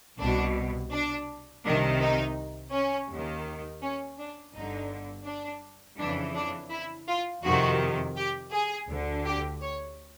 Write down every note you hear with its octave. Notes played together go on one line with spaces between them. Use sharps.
C2 B2 D4
D4
C2 C3 D#3 D4
D#4
C#4
D#2 D#3
C#4
D4
G1 G2 D3 D#4
D4
F2 C#3 E3 D4
D4
E4
F4
F2 C3 D#3 F#4
G4
G#4
D2 D3
G4
C#5